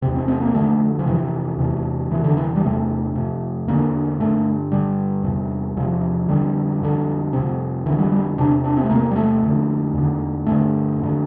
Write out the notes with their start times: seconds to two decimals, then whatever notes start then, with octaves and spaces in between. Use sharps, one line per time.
0.02 E2 C3
0.15 C4
0.28 C4
0.41 A#3
0.54 F2 D3 A3
0.99 F3
1.06 F2 C3 E3
1.58 E2 C3
2.11 E2 C3 E3
2.24 D3
2.37 E3
2.56 G3
2.63 E2 C3 A3
3.15 F2 C3
3.67 E2 D3 A#3
4.20 G2 D3 A3
4.72 G2 D3 G3
5.24 E2 C3
5.77 E2 C3 F3
6.29 F2 D3 G3
6.81 F2 D3
7.33 F2 C3
7.86 F2 D3 E3
7.98 G3
8.12 G3
8.38 E2 C3 D4
8.64 D4
8.77 C4
8.84 A3
8.90 E2 C3 A#3
9.11 G3
9.16 A3
9.42 F2 D3
9.94 E2 D3
10.46 G2 D3 A3
10.99 F2 D3